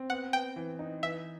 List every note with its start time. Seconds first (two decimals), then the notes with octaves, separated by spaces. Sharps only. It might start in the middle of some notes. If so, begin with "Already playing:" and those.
Already playing: C4
0.10 B3 F#5
0.33 B3 G5
0.56 E3
0.79 D#4
1.03 E3 E5